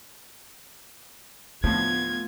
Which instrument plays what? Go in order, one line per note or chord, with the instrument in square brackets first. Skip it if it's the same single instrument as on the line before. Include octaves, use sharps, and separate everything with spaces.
[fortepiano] D2 A2 F3 [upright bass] A3 [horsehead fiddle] B3 F4 [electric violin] G#6